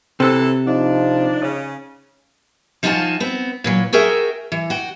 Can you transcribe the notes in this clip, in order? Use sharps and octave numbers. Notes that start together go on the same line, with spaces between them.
C3 E3 C4 A4
F3 D4 D#4
C#3
F3 D#4 F4 F#4 G#5 A5
B3 C4
A#2 E3 F#3
F#4 G#4 A#4 E5 G5
E3
F#4 G5